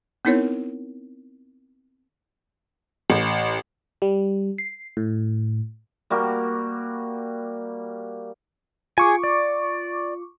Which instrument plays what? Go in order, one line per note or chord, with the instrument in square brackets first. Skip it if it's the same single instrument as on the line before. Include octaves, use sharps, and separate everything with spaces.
[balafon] B3 C4 D#4 E4 A#4 C#5
[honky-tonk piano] A1
[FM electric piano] G3
C7
A2
[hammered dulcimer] G3 A#3 F#4
[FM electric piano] F4 C#6 D6 [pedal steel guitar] G#4 G#5
[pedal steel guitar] D5